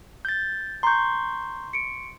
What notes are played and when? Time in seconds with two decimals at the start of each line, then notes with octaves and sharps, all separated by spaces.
0.25 G6 A6
0.83 A#5 C6 C#6 G6
1.73 C#7 D7